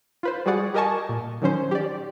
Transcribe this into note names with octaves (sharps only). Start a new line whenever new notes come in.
F4 B4 C5
G3 F#4 G#4 D5 F#5
G4 A#4 D#5 G#5 A5 C#6
A#2
D#3 F#3 C#4 C5
G4 D5